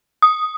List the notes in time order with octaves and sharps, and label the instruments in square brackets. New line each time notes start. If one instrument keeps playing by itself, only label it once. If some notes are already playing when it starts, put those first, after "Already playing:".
[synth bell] D#6